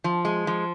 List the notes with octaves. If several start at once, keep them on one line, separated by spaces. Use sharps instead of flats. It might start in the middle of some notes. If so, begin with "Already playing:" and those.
F3
G#3
F3